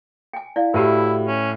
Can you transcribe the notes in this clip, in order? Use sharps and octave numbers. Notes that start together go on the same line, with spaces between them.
G5 G#5
E4 D5 F5
A2 E4 F#4 G4 B4 A5 B5
C#4